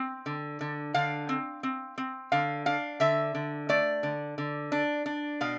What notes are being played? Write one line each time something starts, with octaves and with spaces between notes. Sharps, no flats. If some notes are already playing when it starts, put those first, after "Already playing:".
Already playing: C4
D3
D3
D3 F5
C4
C4
C4
D3 F5
D4 F5
D3 E5
D3
A3 D5
D3
D3
D4
D4
B2 F5